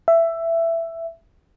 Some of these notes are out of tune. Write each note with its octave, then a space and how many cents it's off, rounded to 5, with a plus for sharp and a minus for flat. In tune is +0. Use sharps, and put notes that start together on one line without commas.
E5 +10